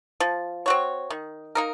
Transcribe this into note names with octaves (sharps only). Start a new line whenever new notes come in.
F3
C4 F#4 C#5
D#3
A#3 D#4 A#4